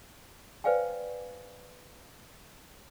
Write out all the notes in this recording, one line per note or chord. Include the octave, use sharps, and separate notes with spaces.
B4 C5 D5 F5 G5 G#5